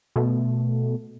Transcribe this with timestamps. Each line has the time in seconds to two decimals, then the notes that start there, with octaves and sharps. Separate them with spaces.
0.16 B2 A3